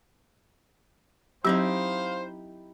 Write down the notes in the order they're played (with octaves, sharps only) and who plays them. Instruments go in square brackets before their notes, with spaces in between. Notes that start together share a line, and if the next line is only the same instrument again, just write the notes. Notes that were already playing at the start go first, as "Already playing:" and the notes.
[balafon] F#3 C4 [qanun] D#4 E4 G4 [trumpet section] C5 F5